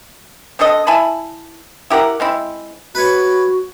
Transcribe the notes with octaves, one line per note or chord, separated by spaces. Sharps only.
C4 D4 A4 D#5
E4 G#5 A5 B5
E4 G4 A#4 F#5
G#3 C4 E4
F#4 B4 C#5